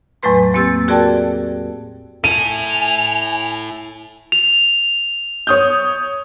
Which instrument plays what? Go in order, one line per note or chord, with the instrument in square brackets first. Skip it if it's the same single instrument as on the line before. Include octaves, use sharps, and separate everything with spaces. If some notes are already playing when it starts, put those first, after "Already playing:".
[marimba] E2 A2 F#3 A3 B4 C6
E2 A#3 C4 G4 E6 A6
F#4 G#4 A#4 D5 G5 A5
[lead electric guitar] E4 A4 [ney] G#5 [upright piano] D#7 [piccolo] F7
[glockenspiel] F7
[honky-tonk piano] C#5 D#6 G6